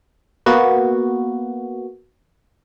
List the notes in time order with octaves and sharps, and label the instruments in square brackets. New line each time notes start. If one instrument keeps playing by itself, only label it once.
[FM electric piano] A#3 B3 F#4